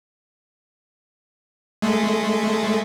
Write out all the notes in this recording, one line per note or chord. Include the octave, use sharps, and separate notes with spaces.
G#3 A3